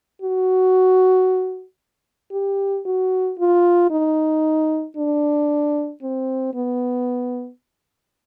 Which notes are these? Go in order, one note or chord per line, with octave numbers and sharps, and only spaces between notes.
F#4
G4
F#4
F4
D#4
D4
C4
B3